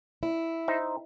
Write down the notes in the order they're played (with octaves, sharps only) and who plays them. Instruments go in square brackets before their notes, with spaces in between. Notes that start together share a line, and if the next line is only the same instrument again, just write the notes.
[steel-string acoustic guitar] E4
[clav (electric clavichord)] D#4 C5 E5